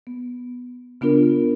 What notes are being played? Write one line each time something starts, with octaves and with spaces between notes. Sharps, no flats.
B3
C#3 B3 D4 F4 A#4